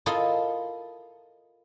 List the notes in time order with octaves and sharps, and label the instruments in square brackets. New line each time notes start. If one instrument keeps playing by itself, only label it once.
[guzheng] E4 F4 A4 A#4 D#5